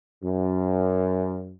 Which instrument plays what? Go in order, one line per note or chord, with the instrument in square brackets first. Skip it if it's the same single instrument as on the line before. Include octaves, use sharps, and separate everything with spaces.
[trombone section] F#2